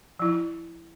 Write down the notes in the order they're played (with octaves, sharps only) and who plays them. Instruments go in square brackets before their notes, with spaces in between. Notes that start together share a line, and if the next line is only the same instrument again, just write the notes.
[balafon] F3 E4